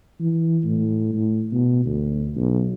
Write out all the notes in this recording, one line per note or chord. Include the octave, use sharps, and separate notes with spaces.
E3
A2
A2
B2
D2
B1